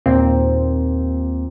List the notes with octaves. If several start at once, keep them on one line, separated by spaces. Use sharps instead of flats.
D#2 A#2 A#3 C4